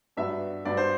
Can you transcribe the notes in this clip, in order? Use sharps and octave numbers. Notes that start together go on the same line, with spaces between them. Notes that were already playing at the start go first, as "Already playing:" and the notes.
G2 F#3 B3 D4 E5
G2 F#3 B3 D4 D5
C5